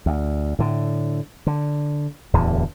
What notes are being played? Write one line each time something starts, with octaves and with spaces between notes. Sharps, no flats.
D2
A2 D3
D3
D1 E2 D3